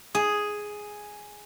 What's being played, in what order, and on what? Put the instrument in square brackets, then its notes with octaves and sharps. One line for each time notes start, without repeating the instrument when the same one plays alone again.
[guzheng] G#4